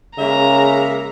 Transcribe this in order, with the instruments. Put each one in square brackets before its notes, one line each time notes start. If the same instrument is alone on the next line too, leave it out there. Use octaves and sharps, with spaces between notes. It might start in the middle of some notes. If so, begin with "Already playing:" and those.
[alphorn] C#3 [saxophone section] G#3 A#3 E5 [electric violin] A#5